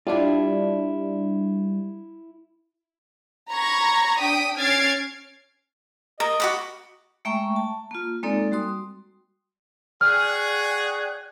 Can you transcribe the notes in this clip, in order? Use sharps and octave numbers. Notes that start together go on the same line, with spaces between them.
G3 D4 E4 F4
A#5 B5 C#6 G#6 A#6
D4 G5 D#6 B6 D7
C#4 F6 G#6 A6 C7 D7
A#4 D#5
F#4 B5 D6
G#3 A3 E5 G5 A#5 C#6
A5
A#3 F4
G#3 A#3 C4 D#4 A4 D5
G3 F#4 C6 D#6
F#4 G#4 D5 G5 F6 F#6